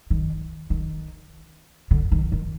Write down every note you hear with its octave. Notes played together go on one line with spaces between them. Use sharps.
D#3
D#3
D3
D#3
D#3